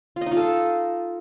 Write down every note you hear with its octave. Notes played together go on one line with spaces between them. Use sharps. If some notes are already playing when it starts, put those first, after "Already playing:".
F4
D#5
D#4
F4
A4